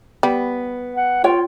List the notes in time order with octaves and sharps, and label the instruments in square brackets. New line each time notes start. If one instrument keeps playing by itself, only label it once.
[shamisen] G3 [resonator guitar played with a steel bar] B3
[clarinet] F#5
[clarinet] F4 [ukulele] C#5 G5